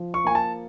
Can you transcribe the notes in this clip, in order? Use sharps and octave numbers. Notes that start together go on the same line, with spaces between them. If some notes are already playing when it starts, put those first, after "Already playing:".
Already playing: F3
C#6
A#3 G#5
A5